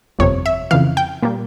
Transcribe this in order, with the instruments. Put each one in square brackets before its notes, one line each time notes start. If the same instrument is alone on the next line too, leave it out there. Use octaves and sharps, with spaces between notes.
[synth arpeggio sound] G1 F2 C3 C#5
E5
F2 C#3 E3 F5
G5
A#2 G3 A#3